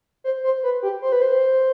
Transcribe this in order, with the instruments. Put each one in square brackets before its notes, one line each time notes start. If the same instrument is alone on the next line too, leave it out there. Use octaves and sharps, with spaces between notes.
[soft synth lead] C5
C5
B4
G4
C5
B4
C5